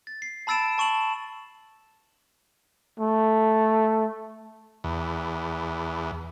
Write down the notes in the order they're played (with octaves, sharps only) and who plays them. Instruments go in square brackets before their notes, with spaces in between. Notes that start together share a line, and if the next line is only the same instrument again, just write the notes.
[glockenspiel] A6
C7
A5 B5 E6 A6 D7 E7
A5 C#6 E7 F#7
[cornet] A3
[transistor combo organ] E2